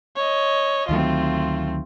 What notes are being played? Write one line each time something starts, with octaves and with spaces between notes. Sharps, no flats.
C#5 D#5
D2 D#3 F#3 A3 C4 F4